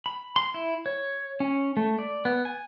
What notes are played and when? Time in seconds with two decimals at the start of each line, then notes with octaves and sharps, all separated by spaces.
0.06 B5
0.36 C6
0.54 E4
0.86 C#5
1.40 C#4
1.77 A3
1.99 D5
2.25 B3
2.45 G#5